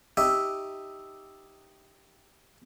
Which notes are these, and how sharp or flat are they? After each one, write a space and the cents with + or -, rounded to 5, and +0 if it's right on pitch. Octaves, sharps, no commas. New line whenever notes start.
D#4 +0 G4 +0 E5 +0